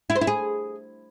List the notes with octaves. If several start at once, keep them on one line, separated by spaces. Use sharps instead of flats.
E4
C5
E4
G#4